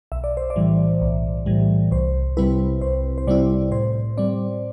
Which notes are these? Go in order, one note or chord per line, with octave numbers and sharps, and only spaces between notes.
B1 E5
D5
C5
D5
A2 E3 G3
B1
A2 E3 G3
C2 C5
C3 G3 C4 E4 B4
C2 C5
C5
C3 G3 C4 E4 D5
A2 C5
G3 C4 D5